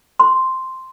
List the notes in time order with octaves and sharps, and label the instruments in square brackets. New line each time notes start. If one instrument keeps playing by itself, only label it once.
[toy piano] C6